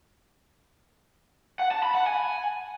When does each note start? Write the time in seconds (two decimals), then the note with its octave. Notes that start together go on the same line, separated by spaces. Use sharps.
1.59 F#5
1.71 A5
1.83 B5
1.95 F#5
2.06 G#5